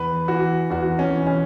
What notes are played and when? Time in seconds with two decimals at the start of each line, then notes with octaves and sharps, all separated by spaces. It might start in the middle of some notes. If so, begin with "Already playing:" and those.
Already playing: E2 B4
0.28 E3 F#4
0.70 E2 F#4
0.99 C#4
1.13 E3
1.27 C#4